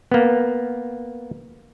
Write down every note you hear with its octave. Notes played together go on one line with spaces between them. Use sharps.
A#3 B3